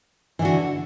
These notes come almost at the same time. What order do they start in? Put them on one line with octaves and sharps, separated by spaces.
E3 D3 F#4